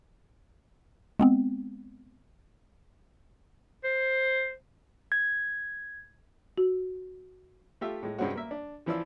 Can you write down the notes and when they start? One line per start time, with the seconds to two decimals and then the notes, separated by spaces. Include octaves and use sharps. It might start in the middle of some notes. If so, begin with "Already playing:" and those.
1.19 G#3 B3 C4
3.84 C5
5.12 G#6
6.58 F#4
7.81 A3 F4 G4 E5
8.02 A2 G#3
8.18 G2 C3 G#3 C4 C#4 F#4
8.35 A#3 E5
8.51 D4
8.86 E3 F3 E4 F4 D5 E6